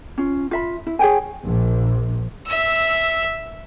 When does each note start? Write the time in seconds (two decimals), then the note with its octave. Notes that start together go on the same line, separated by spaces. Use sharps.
0.18 C#4 F4
0.51 F4 E5 B5
0.86 E4
0.99 G#4 C#5 G5 G#5
1.42 A#1
2.47 E5 E6